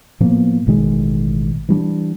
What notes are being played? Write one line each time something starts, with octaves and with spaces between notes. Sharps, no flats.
A2 F3 A#3 B3
A1 B2 D#3 G#3
E3 G3 D4